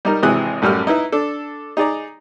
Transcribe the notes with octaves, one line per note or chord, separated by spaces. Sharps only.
G3 D#4 A#4
G#1 C3 E3 G#3 D#6 F#6
A1 F#2 G3 F6
D#4 E4 B4 E5
D4 A4
D#4 G#4 D5 A#5